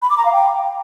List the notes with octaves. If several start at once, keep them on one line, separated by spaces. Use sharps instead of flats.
B5
D6
A#5
F5
G5